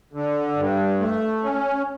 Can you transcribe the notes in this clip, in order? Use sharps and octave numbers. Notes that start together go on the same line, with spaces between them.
D3
G2
A3
C#4